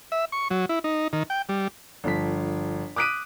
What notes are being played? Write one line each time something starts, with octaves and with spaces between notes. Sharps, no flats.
E5
C#6
F#3
E4
D#4
D#3
G5
G3
G1 F3 B6
D6 D#6 F#6 B6 D7 D#7